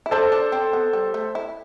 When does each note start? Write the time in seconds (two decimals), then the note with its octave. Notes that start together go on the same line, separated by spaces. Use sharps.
0.06 E4
0.11 D4 A4 C5
0.32 D4
0.52 C4
0.73 B3
0.93 G3
1.14 A3
1.35 E4